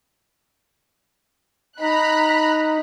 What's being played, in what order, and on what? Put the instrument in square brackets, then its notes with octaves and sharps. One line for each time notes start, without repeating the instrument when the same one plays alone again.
[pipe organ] D#4 [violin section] A#5 B5 F#6